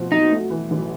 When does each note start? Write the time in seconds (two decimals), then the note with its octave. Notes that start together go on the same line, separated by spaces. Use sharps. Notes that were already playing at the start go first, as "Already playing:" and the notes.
Already playing: B2 F3 A3 C4
0.11 F#3 D#4
0.31 A3
0.50 E3
0.71 A1